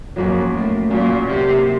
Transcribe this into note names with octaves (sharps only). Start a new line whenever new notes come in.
F2 F#3 A#3 C#4
A2
A#2 F#3 A#3 C#4
C3